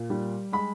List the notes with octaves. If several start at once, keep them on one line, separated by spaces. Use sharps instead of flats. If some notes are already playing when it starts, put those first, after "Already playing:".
Already playing: A#2
G3
G#3 B5